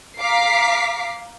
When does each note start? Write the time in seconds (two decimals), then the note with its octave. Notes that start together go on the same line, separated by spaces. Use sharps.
0.20 F5 A#5 D6 B6 C7